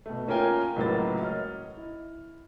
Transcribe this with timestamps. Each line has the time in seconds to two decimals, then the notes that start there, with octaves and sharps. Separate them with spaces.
0.06 B2 A3
0.28 A#3 C#4 F4 A#4 G5 G#5
0.76 C#2 A2 F#3 A#3 B4 A6
1.21 C#5 D#5 F6
1.77 E4